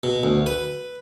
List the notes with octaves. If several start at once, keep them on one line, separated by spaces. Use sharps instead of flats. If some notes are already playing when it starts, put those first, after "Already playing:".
B2
D2
B4